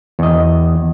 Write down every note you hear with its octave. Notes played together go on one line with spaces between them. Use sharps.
E2 D#5